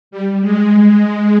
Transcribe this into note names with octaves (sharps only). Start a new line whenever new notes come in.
G3
G#3
G#3